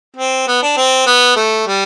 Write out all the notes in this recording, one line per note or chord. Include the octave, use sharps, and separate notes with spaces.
C4
B3
D4
C4
B3
A3
G3